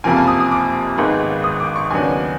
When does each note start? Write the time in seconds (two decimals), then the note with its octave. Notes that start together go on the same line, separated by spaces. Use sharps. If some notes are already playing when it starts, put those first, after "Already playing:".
0.04 F#1 F2 C3 F3 A#3 G#5
0.16 A5
0.28 D#6
0.40 D#6
0.52 D6
0.97 G#1 G#2 D#3 G#3 B3
1.44 D#6
1.60 D6
1.76 C#6
1.91 D#2 C#3 F#3 B3 D4 G#5